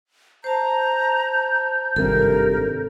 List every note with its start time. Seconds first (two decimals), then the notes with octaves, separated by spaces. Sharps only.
0.44 C5 A5 A#5 G6
1.96 G#1 G2 C3 A4 A#4